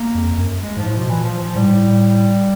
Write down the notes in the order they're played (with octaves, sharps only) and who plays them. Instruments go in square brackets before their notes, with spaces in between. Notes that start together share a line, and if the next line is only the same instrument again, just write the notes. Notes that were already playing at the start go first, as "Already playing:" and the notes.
Already playing: [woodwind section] A#3
[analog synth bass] F2
F#2
[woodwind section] G#3
[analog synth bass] G#2 [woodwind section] F3
[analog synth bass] A2
[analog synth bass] B2 [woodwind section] F3
[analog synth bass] A#2 [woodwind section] E3
[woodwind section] F3
F3
[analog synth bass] A2 [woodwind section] G3
[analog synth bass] G#2
A2